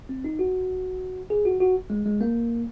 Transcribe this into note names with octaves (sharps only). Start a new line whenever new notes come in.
C4
D#4
F#4
G#4
F#4
F#4
G#3
G#3
A#3